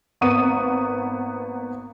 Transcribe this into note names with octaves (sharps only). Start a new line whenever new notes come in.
G#1 A#3 B3 C#6 D#6 D#7